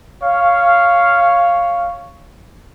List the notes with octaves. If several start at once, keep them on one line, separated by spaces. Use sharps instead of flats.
C#5 F5